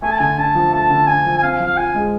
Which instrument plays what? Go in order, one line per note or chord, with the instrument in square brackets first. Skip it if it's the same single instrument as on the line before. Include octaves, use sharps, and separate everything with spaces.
[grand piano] A3 [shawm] G#5
[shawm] A5
[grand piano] D3 [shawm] G#5
[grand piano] D4 [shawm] A5
[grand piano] F3
[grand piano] A3 [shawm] A5
[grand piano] D3
[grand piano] D4 [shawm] G#5
[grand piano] F3
[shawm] G#5
[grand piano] C4 [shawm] F5
[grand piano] F3
[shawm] F5
[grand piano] F4 [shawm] G#5
[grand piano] G#3